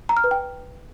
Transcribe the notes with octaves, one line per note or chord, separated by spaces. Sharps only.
A#5
F6
B4
G5